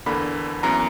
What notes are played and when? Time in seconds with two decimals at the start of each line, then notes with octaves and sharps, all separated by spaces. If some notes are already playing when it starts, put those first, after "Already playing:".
0.06 E2 D3 A#3 B5
0.63 F#2 E3 B3 A#5